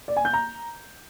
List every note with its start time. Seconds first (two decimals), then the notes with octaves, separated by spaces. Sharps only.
0.08 D5
0.16 G#5
0.25 G6
0.33 A#5